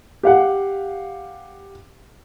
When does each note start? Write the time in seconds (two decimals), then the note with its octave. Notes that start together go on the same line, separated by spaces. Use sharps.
0.23 G4 F5 F#5